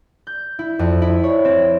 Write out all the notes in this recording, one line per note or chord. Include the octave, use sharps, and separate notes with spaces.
G6
E4
F2
E4
C#5
C4